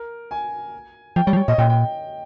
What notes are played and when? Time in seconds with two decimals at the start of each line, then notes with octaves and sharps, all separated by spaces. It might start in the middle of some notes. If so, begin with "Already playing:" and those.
Already playing: A#4
0.31 G#5
1.16 F3 G5
1.26 G3 C#5
1.33 F3
1.37 G3
1.48 A#2 D#5
1.58 A#2 G5
1.70 G5